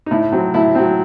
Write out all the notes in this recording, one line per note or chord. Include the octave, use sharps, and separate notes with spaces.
D#4
A2 E4
F#3 C4
A2 E4
F#3 C4